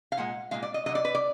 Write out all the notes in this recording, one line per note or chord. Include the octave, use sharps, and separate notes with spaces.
F5
A#2 G#3 F#5
A#2 G#3 F5
D5
D#5
D3 F#3 D#5
D5
B4
D5